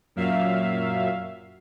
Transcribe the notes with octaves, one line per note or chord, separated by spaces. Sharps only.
F#2 A#2 F#3 E5 F5